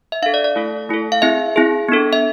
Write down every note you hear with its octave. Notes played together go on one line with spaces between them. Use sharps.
E5
D4 A4 F5
D5
D5
A3 E4 A4
A3 E4 A4
F5
C4 E4 G#4 E5
C4 E4 G#4
B3 D4 A4
E5